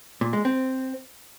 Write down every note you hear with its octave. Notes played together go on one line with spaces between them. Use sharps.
A#2
G#3
C4